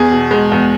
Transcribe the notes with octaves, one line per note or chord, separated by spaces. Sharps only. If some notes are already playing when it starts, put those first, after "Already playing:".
Already playing: E2 G#4
B2
G#3
E2